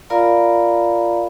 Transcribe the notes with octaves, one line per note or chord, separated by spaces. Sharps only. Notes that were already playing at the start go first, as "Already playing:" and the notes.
F4 A#4 D5 F5 A#5 B5